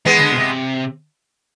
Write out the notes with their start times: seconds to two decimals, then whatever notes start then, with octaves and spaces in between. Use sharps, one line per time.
0.05 E3 G#3 B3
0.21 D3
0.32 B2
0.38 C3